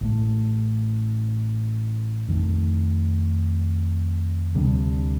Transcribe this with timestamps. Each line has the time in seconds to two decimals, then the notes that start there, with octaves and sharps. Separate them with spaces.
0.01 A1 A2 A3
2.28 F2 D#3 A3
4.55 D2 C3 G3 D4